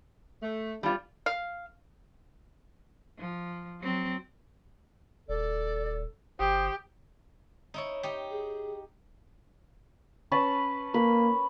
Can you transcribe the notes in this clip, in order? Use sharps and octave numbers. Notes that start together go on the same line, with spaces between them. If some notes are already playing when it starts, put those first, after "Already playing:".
A3
G3 B3 C4 D4 F4
F5
F3
F#3 C4
D#1 A4 D5
G1 G4 C5 D#6
D#4 E4 C#5
D#4 G4
G#4
C#4 B4 A5
A#3 B4